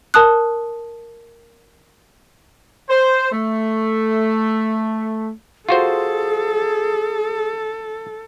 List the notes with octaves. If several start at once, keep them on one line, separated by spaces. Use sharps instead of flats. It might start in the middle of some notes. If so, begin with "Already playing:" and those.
A#4 A5 D#6 F#6
C5
A3
F4 F#4 G#4 A4 C5